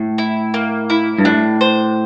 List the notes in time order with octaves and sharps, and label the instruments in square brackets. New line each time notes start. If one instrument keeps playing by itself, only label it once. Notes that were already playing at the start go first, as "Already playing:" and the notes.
Already playing: [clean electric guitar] A2
[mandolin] E4
A#3
E4
[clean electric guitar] G2
[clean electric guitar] A2 [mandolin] D4
[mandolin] C5